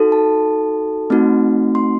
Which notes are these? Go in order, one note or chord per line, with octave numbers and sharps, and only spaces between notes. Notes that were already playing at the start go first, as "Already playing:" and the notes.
Already playing: D#4 F#4 A4
A5
A3 C4 D#4 F#4
C6